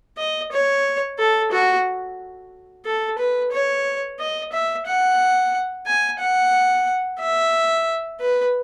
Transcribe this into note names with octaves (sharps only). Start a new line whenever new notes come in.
D#5
C#5
A4
F#4
A4
B4
C#5
D#5
E5
F#5
G#5
F#5
E5
B4